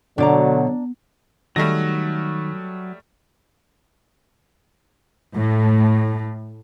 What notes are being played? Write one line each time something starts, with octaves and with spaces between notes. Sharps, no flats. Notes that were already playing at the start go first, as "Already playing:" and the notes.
B2 D3 F#3 D4 D5 A#5
D#3 F#3 G3 A3 D#4 A#6
A2